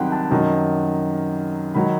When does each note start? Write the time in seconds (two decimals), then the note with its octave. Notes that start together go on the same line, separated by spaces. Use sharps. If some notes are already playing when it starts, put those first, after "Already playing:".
Already playing: C2 C3 D#3 F#3 F#5 G5 C6
0.12 A5
0.30 F#2 D#3 F#3
1.74 D#3 F#3 B5